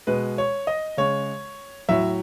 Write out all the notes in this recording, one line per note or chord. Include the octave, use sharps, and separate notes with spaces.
B2 G#3 B4
C#5
D#5
C#3 G#3 C#5
A2 F#3 E5